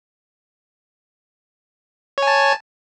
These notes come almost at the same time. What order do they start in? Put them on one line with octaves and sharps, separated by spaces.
C#5 G#5 A5